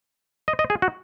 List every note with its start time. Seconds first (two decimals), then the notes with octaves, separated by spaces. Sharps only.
0.48 D#5
0.59 D#5
0.70 G#4
0.82 F#4